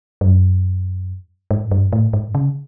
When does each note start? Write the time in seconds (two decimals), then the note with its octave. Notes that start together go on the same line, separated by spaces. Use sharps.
0.21 G2
0.25 F#2
1.51 G#2
1.71 G2
1.93 A2
2.13 G#2
2.35 C#3